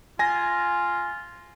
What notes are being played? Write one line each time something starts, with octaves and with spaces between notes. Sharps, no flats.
F4 G#5 A#6